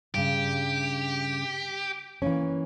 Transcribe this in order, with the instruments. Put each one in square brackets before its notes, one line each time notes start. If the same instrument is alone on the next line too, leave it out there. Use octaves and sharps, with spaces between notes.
[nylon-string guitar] G2 C#3 [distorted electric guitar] G4
[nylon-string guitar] E3 A#3 C#4